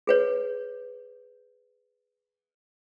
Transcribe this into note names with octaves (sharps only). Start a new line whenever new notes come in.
G#4 B4 C#5